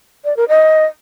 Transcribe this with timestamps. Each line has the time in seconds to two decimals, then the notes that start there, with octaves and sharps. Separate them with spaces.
0.25 D5
0.37 A#4
0.49 D#5